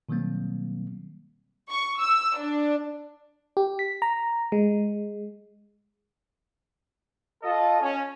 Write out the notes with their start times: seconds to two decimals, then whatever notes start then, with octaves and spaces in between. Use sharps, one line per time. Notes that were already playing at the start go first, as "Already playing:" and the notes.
0.09 B2 D#3 F#3 G3 A#3 C4
1.70 C#6
2.00 E6
2.37 D4
3.57 G4
3.79 B6
4.02 A#5
4.52 G#3
7.43 F4 A4 D#5
7.82 C#4